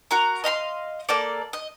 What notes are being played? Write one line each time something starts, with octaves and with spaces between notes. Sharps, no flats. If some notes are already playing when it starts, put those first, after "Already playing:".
F#4 A#4 A#5
D#5 F5 B5 C6
A#3 A4 D5
D#5